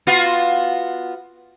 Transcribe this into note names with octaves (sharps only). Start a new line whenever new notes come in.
B3 F4 F#4